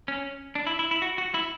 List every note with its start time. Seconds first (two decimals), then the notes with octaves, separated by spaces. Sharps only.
0.08 C#4
0.55 D4
0.67 E4
0.79 E4
0.91 E4
1.02 F#4
1.18 F#4
1.34 E4